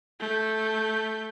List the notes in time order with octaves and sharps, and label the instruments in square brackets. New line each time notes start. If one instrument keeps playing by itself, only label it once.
[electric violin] A3 G6